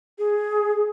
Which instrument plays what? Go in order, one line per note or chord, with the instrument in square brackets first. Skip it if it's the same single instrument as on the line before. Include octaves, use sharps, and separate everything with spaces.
[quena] G#4